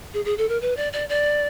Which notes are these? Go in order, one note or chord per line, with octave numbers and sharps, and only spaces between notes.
G#4
G#4
A4
A#4
B4
D5
D5
D5